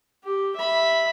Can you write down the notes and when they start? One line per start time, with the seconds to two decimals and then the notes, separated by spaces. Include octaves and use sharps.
0.23 G4
0.56 E5 B5